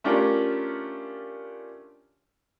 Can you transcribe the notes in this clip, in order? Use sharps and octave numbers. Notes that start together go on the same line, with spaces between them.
A3 C#4 D4 F4 G4 A#4